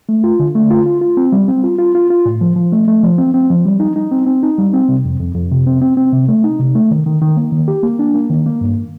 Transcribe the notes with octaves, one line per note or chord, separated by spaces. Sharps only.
A3
F4
D3
A3
F4
F4
F4
C4
G3
C4
F4
F4
F4
F4
A2
F3
F3
A3
A3
F3
C4
C4
F3
G3
D#4
D#4
C4
C4
D#4
G3
C4
C3
F2
F2
F2
C3
C4
C4
C4
C3
A3
D#4
C3
A3
D#3
D#3
D#3
A#3
D#3
G4
A#3
D4
A#3
D#3
A#3
G2